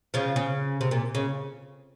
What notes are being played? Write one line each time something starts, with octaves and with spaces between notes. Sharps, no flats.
C#3 F3
C#3
C3
A#2
C#3